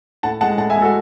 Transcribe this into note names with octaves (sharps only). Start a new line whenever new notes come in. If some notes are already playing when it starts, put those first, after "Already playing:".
A2 F#5 A5
G#3 F#5 A5
A2 F#5 A5
E5 G#5
G#3
F#4 A4